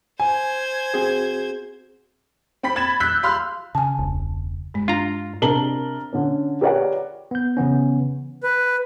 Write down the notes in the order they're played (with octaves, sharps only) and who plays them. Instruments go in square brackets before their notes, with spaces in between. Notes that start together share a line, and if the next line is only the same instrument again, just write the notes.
[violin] C5 G#6 [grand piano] G#5
[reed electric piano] C4 F#4 G#4
[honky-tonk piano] C4 G5 B5 B6
B5 G#6 A6 E7
E6 F#6 G6 B6
F5 B5 C6 F6
[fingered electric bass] C#3 [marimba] G#5 A5
[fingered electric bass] E1 C#2
[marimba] G2 G#3
[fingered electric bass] D4 [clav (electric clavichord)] F4 A#5
[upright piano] C3 D4 A#4 A5 F#7 G7
D3 C#4
G4 A#4 B4 C#5 D5 F#5
[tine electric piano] B3 G6
C#3 E3 B3 C#4
[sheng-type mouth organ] B4